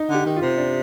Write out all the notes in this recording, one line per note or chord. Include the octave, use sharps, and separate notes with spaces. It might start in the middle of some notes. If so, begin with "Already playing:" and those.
Already playing: D#4
D3
G4
D#3
F4
C3
D4